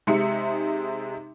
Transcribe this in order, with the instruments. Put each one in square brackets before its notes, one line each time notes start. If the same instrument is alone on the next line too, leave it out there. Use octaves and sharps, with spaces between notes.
[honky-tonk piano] C3 G#3 D#4 E5 C#7